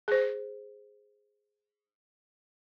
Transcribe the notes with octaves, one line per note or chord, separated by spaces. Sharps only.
G#4 C5